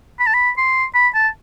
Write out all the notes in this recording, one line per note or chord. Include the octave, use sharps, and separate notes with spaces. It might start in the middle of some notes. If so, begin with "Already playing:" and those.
B5
A5
B5
C6
B5
A5